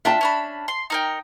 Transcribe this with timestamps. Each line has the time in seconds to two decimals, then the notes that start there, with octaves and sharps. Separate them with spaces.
0.05 D4 F4 E5 G5 A5
0.21 C#4 D4 B5
0.68 C6
0.90 D#4 A#4 G5